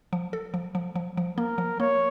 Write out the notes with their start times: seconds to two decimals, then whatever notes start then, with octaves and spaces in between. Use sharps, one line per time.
0.13 F3
0.33 A4
0.54 F3
0.75 F3
0.96 F3
1.17 F3
1.38 A#3 A#4
1.58 F3
1.80 A#3 C#5